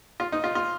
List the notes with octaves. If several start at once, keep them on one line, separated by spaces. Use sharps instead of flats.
F4
D#4
F4
F4